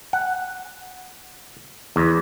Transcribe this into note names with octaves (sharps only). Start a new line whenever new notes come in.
F#5
E2